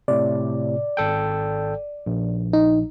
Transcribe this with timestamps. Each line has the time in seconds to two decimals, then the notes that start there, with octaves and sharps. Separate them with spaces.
0.08 A2 C3 D5
0.97 G#1 A4 G5
2.06 A#1
2.53 D#4